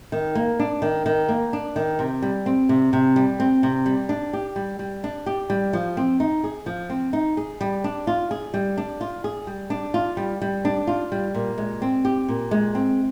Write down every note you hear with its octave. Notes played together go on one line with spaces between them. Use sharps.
D#3
A#3
D4
D#3
D#3
A#3
D4
D#3
C3
G3
C4
C3
C3
G3
C4
C3
G3
D4
G4
G3
G3
D4
G4
G3
F3
C4
D#4
G#4
F3
C4
D#4
G#4
G3
D4
F4
G#4
G3
D4
F4
G#4
G3
D4
F4
G3
G3
D4
F4
G3
A#2
G#3
C4
G4
A#2
G#3
C4